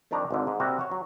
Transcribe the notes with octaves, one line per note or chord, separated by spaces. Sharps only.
F2 D#3 G3 D4 G4 A#5
G#1 G#2 D3
G#2
C3 G3 A#3 C4 F#4
F#4 C#5
F#3